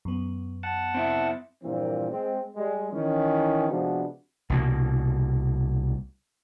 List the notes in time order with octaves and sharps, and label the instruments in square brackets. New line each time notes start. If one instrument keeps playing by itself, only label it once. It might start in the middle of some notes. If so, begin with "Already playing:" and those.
[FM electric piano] F#2 B3
[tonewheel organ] F#5 A5
[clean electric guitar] C4 E4 E5
[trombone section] G2 A#2 E3 F3 A#3 C4
G#3 C4
G3 G#3
D#3 E3 C#4
C3 F3 G#3 B3 D4 F#4
[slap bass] C2 B2 F#3 A#3